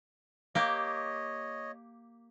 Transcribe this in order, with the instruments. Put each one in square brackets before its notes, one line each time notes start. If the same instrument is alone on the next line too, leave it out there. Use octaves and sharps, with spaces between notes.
[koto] A#3 G4 [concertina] C#5 D#5